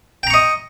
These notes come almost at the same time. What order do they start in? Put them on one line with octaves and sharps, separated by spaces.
G5 A#5 C#6 D#5